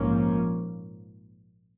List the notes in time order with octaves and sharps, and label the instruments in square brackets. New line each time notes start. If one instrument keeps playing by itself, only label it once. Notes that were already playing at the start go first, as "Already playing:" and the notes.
Already playing: [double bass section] A#1 G#2 F3 A#3 C#4